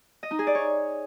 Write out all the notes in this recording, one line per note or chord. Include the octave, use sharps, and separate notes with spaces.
D#5
D#4
G#4
D5
C#5